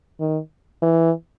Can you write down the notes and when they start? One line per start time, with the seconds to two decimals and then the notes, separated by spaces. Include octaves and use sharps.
0.20 D#3
0.82 E3